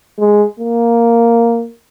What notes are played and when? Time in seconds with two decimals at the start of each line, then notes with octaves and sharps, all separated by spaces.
0.19 G#3
0.60 A#3